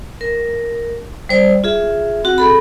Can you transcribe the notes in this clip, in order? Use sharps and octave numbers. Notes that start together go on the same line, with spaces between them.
A#4
G3 C5 D5
F4 G#4 E5
C4 F#4 F#5
G#4 A4 B5